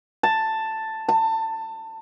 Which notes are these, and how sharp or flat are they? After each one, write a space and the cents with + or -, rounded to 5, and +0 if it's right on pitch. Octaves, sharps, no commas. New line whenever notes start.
A5 +5
A5 +25